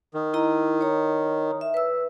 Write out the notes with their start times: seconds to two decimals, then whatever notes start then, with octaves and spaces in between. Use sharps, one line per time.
0.14 D#3
0.34 E4 D#5 A#5
0.81 C#5 A#5
1.61 E5
1.74 B4 E6